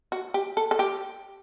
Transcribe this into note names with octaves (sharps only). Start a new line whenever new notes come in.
F#4
G4
A4
A4
G4